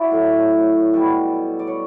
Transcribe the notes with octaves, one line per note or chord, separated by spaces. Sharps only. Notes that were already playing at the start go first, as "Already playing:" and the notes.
Already playing: E4 F#4 D5 E5
A2 F#3
B2 G3 A4
D5
C#5